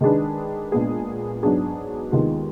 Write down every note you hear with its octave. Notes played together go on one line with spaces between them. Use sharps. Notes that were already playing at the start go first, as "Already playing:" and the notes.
D#3 G#3 D4 G#4 B4
A#2 G#3 B3 D4 G#4
G#2 F#3 B3 D4 G#4
D#2 D#3 G#3 B3 F4